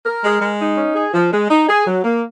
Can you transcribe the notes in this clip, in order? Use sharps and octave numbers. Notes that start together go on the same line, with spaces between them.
A#4
G#3
G#3
D#4
C#4
G#4
F3
G#3
D#4
G#4
F#3
A#3